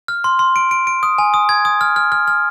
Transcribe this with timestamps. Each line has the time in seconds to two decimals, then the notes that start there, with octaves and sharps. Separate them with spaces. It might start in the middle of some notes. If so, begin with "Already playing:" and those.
0.08 F6
0.24 C6
0.39 C6
0.56 D7
0.71 D7
0.87 D7
1.03 D#6
1.18 G#5
1.34 D#6
1.49 G#6
1.65 D#6
1.81 F6
1.96 F6
2.12 F6
2.27 F6